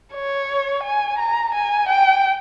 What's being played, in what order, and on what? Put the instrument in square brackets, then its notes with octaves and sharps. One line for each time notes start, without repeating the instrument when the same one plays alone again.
[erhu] C#5
G#5
A#5
G#5
G5